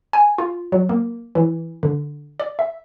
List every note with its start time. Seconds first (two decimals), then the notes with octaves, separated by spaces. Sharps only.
0.13 G#5
0.38 F4
0.72 F#3
0.89 A#3
1.35 E3
1.83 D3
2.40 D5
2.59 E5